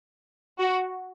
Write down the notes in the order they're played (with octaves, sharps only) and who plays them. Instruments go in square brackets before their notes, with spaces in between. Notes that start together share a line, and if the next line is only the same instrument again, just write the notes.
[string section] F#4